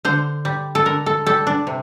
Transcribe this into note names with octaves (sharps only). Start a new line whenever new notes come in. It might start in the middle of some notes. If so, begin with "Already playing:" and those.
D3 C5
G3
A4
D3 A#4
A4
G3 A4
D4
C3